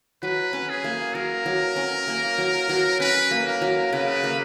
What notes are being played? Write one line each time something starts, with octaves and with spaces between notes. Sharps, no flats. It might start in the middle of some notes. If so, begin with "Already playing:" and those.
F#3 B4
C#4
G#4
A#3
F#3 A#4
F#3
C#4
A#3
F#3
F#3
C#4 B4
A#3
A#4
F#3
C#3 B4
A#3